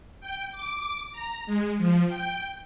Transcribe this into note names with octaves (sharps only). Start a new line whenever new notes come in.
G5
D6
A#5
G#3
F3
G5